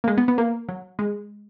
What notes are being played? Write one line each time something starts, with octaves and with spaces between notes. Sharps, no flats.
A#3
G#3
B3
B3
A#3
F#3
G#3